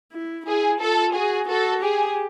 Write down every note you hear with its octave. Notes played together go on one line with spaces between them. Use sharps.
E4
E4 G#4
F4 A4
F#4 G#4
F#4 A4
G4 G#4